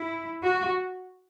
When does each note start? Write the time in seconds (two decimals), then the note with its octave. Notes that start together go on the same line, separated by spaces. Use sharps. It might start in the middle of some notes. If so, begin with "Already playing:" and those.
Already playing: E4
0.44 F#4